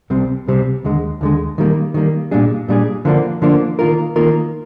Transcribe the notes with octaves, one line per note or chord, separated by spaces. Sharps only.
C2 C3 G3 C4
C2 C3 G3 C4
D#2 D3 G#3
D#2 D3 G#3
D#3 G3 A#3
D#3 G3 A#3
A#2 G3 D4 G#4
A#2 G3 D4 G#4
D3 F3 A#3 D4
D3 F3 A#3 D4
D#3 A#3 F4 A#4
D#3 A#3 F4 A#4